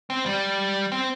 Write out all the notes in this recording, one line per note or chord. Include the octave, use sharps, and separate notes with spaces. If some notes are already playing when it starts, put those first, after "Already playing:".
C4
G3
C4